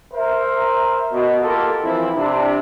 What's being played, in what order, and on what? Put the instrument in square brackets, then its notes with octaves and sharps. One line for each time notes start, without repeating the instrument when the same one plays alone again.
[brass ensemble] A#4 C5 E5
B2
A#3 F4 G4 A4 A#4
E3 F3 C4 E4
C3 D4